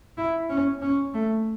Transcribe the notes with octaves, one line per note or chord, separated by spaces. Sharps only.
E4
C#4
C#4
A3